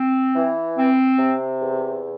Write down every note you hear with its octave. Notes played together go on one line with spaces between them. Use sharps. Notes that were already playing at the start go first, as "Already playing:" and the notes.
Already playing: C4
E3
C4
C3
E2